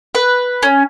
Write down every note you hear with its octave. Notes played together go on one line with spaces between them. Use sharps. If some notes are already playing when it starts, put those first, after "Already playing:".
B4
C#4